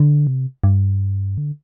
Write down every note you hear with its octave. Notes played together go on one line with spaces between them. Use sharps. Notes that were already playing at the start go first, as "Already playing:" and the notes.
Already playing: D3
C3
G2
D3